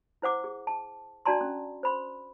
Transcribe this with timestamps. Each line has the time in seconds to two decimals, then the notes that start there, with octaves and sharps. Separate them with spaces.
0.22 E4 C5 F#5 D6
0.44 G#4
0.67 A5
1.26 D4 F#4 D5 A5 A#5 C6
1.41 C#4
1.83 C5 B5 C6